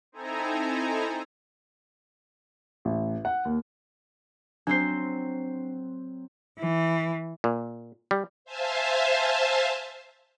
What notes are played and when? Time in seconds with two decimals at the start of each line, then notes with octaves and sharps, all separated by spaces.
0.12 C4 D#4 E4 A4 G#5 A#5
2.85 A1
3.25 F#5
3.45 D#2
4.67 F#3 C4 D4 C5 C7
6.58 E3
7.44 A#2
8.11 G3
8.45 C5 E5 F5 G#5 A5